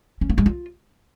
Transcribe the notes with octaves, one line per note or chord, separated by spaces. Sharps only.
C#4
A#3
G#3
F4